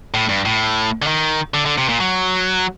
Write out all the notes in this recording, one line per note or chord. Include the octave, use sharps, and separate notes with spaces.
A2
G2
A2
D3
D#3
D3
D3
C3
A#2
F#3